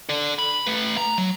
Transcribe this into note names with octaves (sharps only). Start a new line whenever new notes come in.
A4 D5
B5
A3 B4
A#5
F#3